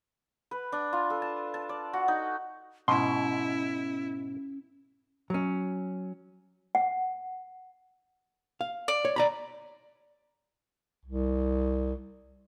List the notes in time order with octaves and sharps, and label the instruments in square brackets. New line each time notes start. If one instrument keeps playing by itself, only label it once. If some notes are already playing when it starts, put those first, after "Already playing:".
[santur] B4
D4
F4
A4
A5
A5
D5
F#4
D#4
[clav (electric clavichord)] G#2 B2 [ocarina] C#4 [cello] E4 [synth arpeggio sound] C6
[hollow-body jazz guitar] F#3 C#4
[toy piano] F#5
[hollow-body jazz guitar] F5
[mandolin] D5
[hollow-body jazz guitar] C#5
D5 A#5 B5
[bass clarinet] C2